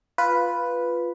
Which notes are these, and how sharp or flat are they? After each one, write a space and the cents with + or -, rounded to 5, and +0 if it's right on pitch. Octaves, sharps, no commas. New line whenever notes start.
F4 +0 B4 +0